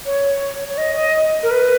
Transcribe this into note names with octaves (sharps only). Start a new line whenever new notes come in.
C#5
C#5
D#5
D#5
A#4
B4